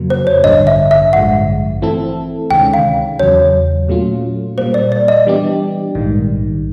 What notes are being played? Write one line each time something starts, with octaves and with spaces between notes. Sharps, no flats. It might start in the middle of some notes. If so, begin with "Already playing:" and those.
Already playing: F2 C#3 F#3 A#3
C5
C#5
A1 G2 D3 D#5
E5
E5
A1 G2 D3 F3 G#3 F#5
E3 A3 C4 E4 A4
D2 C3 D#3 G#3 C#4 G5
F5
E2 C#3 F#3 C#5
A#2 F#3 A3 C#4 F4
A#2 G3 A#3 C5
D5
D5
D#5
E3 G3 B3 D4 G4
A#1 G#2 D#3 G3